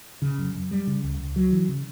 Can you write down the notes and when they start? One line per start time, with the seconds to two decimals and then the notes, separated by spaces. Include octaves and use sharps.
0.22 C#3
0.38 F#2
0.55 F#2
0.71 G3
0.87 C#3
1.04 C#2
1.19 C#2
1.36 F#3
1.52 E3
1.69 C#3